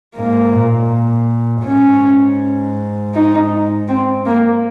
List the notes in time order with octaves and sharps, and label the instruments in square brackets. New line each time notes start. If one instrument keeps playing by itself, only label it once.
[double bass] G#2 [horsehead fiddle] A#3
[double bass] A#2
[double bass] G#2 [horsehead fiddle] C#4
[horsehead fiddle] D#4
C4
A#3